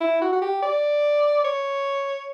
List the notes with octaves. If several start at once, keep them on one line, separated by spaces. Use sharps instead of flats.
E4
F#4
F#4
G4
D5
C#5